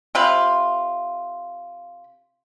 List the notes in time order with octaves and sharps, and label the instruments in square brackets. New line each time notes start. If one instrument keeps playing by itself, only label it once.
[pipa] C3 F4 B5